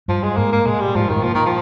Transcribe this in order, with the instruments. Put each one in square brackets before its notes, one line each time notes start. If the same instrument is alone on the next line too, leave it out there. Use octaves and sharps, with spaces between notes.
[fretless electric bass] G2 [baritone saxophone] F3
[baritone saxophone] G#3
[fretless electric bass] G#2 [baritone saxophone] A#3
[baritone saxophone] A#3
[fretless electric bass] A#2 [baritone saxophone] G#3
[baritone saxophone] G3
[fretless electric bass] G#2 [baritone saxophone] F3
[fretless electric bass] G2 [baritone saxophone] D#3
[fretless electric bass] G#2
[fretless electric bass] A#2 [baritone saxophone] F3
[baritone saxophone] D#3
F3